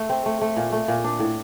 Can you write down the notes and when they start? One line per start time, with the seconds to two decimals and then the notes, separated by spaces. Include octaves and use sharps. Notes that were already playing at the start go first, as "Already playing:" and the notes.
Already playing: A3
0.10 C4
0.26 A3
0.42 A3
0.57 A#2
0.72 A3
0.88 A#2
1.04 D4
1.19 A2